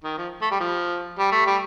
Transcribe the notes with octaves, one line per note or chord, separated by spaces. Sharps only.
D#3
F3
A3
G3
F3
G3
A3
G3